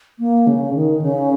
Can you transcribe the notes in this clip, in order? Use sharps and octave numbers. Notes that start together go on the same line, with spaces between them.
A#3
C#3
D#3
C#3